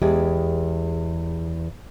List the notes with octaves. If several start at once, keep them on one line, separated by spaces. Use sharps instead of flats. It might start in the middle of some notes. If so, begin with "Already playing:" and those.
E2 G#3 G4